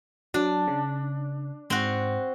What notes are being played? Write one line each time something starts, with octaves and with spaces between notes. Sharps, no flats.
F#3 D4
C#3
G#2 C4 F#4